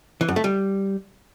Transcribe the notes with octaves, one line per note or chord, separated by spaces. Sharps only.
E3
F#2
A3
G3